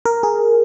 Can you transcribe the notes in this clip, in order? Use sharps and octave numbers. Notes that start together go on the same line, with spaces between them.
A#4
G#4